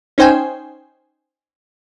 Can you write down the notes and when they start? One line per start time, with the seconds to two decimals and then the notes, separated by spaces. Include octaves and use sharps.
0.18 C#4 D#4 C5 G5 G#5